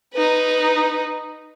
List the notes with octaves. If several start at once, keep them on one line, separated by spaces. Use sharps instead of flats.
D#4 B4